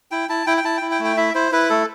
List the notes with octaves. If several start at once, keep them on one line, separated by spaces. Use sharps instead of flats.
E4 G5
E4 A5
E4 G5
G5
E4 A5
E4 G5
G5
A3
G5
E4 E5
E4 C5
E4 B4
A3 A4